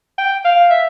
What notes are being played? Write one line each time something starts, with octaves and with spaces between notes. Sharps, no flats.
G5
F5
E5